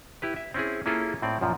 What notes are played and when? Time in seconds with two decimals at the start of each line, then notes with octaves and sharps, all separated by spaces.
0.22 E4 G4 B4
0.36 E5
0.54 C4 C#4 E4 G#4
0.86 A#3 C#4 E4 F4 G#4 A4
1.22 A2 C4 D5
1.41 F#2 A#2 F3